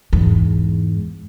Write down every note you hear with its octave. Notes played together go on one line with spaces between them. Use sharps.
E2 G#2